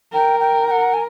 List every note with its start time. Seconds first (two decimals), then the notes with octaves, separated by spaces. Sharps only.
0.13 A#4 G5
0.39 G5
0.67 G5
0.70 F#5
0.93 G#5